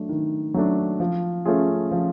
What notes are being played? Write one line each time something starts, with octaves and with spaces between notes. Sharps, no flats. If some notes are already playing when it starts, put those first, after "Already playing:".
Already playing: F#3 A3 D4
D#3
F#3 A3 D4
F3
A3 C#4 F4 G#4
F3